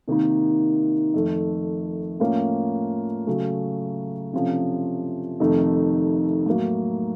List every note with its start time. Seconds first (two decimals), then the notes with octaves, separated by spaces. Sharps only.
0.08 C3 D#3 A#3 D#4
1.14 F2 D#3 A3
2.20 A2 F3 A#3 C#4
3.27 C#3 F#3 A3
4.33 C3 F3 A3 C#4
5.40 F2 C3 D#3 A3 D#4
6.46 A2 F#3 A#3